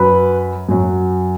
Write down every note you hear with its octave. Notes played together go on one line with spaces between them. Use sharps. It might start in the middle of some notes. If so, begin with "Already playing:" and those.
Already playing: F#2 F#3 B4 B5
F#2 F#3